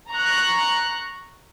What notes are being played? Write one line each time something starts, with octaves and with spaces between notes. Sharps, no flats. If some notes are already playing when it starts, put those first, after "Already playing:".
A#5 C#6 F#6